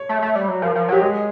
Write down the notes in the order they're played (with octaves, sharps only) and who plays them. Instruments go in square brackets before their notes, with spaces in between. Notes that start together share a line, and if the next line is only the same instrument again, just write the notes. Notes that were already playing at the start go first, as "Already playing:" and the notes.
Already playing: [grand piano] C#5
[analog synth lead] A3
A3
G3
F#3
[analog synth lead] F3 [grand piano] A#4
[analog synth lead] F3
[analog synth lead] F#3 [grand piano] G4
[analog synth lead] G#3 [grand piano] G#4